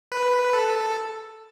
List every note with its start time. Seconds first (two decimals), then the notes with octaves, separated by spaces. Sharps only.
0.12 B4
0.53 A4